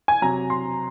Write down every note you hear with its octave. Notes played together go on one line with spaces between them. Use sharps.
G#5
C3 F#3 A#5
C6